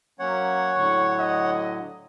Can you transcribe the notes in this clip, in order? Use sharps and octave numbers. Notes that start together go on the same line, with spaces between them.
F#3 A#3 C#4 C#5 F#5
A2 D3 F#3 C#6
D#5